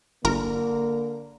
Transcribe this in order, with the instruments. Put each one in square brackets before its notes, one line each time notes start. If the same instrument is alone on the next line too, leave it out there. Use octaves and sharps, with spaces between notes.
[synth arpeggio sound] G1 A#4 A#5 [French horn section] D3 A#3